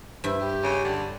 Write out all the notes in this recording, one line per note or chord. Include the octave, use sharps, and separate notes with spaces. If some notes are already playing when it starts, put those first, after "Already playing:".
G2 E4 C5
G4
C#3
D3